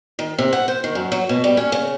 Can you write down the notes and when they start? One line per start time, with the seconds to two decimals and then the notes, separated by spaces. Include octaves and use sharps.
0.19 D#3
0.38 C3
0.53 F#5
0.68 C5
0.84 D#3
0.95 F#2
1.12 F#3
1.29 B2
1.44 G3
1.57 C#4
1.72 C#3